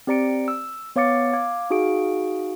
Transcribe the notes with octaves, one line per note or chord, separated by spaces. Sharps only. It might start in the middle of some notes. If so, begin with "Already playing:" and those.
C4 G4 D5 A#5 C#7 D7
E6
B3 C#5 F5 D6 A6 C#7
F5 D6 G#6
D#4 F#4 G#4 F5 D7